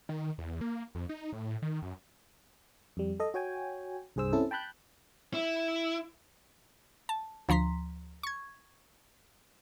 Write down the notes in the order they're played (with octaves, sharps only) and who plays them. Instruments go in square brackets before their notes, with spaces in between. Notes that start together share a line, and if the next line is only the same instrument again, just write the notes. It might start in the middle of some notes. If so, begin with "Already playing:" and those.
[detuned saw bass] D#3
E2
A#3
F2
D#4
A2
D#3
F#2
[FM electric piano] F2 G3
A4 D#5
F#4 C#5 G5 G#5
C2 G2 G#4 C5 E6
C4 C#4 E4 A4
G5 A5 B5 F#6 G6
[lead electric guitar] E4
[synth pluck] A5
D2 F3 A#5 C6 B6
C#6 G#6